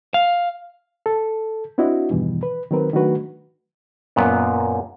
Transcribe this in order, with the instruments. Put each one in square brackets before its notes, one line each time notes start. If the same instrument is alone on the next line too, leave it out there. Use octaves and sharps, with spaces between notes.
[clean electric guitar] F5
[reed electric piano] A4
C4 D4 E4 F#4 D#5
E2 G2 B2 D#3 E3
B4
D#3 F#3 C4 A#4 B4
D#3 F#3 A3 D4 F#4 B4
[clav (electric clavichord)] F#2 A#2 B3